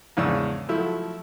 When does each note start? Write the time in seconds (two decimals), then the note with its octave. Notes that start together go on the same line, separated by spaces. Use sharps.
0.17 E2 G#2 C#3 C#4 D4 E6
0.69 F3 F#3 A3 E4